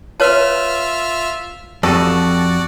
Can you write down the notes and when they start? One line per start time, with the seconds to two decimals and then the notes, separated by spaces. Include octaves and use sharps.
0.20 F4 B4 C#5 E5 A5 F6
1.83 F2 F#4 G4 A4 D5 A5 C#6